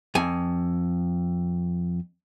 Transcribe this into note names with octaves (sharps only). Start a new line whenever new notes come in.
F2 G#5